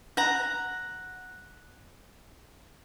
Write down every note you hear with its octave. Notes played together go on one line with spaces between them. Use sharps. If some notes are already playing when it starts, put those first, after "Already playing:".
F#5 A#5